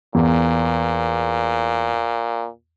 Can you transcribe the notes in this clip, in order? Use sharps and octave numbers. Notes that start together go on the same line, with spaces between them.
E2 A#2